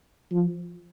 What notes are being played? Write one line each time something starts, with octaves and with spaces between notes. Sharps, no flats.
F3